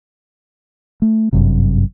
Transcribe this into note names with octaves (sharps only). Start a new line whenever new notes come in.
A3
G1 F#2 C3